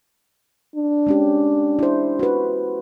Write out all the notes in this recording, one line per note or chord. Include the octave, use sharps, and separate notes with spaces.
D4
G#3 C#4 G4
E4 C5
F#4 B4